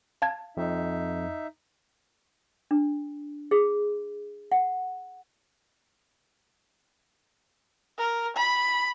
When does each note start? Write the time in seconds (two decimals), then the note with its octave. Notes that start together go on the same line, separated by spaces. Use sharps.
0.22 F5 A5 G#6
0.57 F2 D#4 E5
2.71 D4
3.51 G#4
4.52 F#5
7.99 A#4
8.37 B5